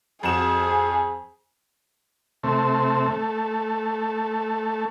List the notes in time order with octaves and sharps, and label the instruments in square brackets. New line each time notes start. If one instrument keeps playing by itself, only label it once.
[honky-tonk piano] F2 F#4 E7 [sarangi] G#4
[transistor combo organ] C3 A3
A3